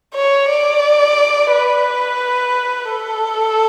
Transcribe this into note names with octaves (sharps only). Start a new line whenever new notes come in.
C#5
D5
B4
A4